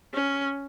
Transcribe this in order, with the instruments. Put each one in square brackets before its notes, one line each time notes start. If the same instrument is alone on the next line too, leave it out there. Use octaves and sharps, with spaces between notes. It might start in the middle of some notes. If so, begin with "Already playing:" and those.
[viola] C#4